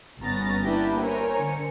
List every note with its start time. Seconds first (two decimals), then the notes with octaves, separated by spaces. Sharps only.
0.21 G1 B3 C#4 A#5 A6 A#6
0.62 A#3 B3 D4 E4 G4 B4
0.99 A#4 C5 C#5 G#5 A#5
1.39 D3 C#7